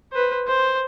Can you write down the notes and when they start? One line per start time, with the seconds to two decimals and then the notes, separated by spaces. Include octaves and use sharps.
0.13 B4 C5
0.47 C5